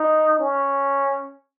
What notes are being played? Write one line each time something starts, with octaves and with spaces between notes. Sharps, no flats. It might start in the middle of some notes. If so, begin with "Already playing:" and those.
Already playing: D#4
C#4